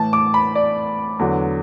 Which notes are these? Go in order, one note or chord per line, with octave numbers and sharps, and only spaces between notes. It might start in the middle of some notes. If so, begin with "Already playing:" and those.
Already playing: A2 E3 A5
D6
B5
D5
E2 D3 F#3